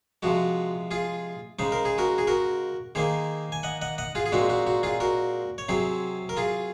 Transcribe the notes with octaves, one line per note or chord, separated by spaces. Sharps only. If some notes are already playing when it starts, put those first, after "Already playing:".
C3 F3 G#3 F#4
F4 G#4
C#3 G#3 D#4 C5
A#4
G#4
F#4 A#4
G#4
F#4 A#4
D#3 A#3 D#4 G#4 C5
G#5
D#5 F#5
D#5 F#5
D#5 F#5
F4 G#4
G#4
A#2 G#3 C4 D#4 F#4
F#4
F#4
F4 G#4
F#4 A#4
C#5
C3 F#3 C4 G#4 C5
A#4
F4 G#4